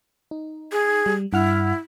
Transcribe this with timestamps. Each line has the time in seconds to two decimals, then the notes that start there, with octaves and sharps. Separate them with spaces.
0.31 D#4
0.72 G#4
1.06 G3
1.33 G2 E4 F#5 F6